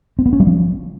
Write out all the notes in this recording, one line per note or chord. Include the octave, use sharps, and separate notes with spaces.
C4
B3
C#4
G3
F3